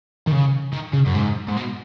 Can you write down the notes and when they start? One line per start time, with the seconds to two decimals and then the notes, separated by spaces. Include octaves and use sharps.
0.27 D#3
0.32 C#3
0.73 D#3
0.93 C#3
1.06 F#2
1.15 G#2
1.48 G#2
1.57 B2